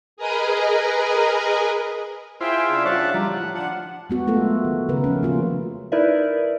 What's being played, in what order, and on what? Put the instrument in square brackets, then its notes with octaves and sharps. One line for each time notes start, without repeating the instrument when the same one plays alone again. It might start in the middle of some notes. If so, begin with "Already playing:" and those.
[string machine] G#4 A#4 B4 D#5 G#5 A#5
[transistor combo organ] E4 F4 C5 [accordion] G#4 E5 G5
[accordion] C#3 D4 E5
[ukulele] F4 F#4 C#5 [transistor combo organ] F#5 A5
[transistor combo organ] F3 G3 [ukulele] A#5
[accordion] A2 [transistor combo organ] F#5
[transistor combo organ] F3 [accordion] D4 F#5
[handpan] G#3 B3 F#4
F#3 A3 F4 A4 A#4
D#3
C#3 A#4 B4
F3 C#4
A#3 F4 F#4
[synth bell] D#4 E4 A#4 B4 D5 E5